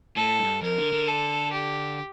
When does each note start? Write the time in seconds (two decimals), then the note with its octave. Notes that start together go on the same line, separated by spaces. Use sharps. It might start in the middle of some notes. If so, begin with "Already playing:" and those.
0.16 A2 A4
0.39 G2
0.62 F2 A#4
0.78 D3
0.93 D3
1.08 A4
1.52 G4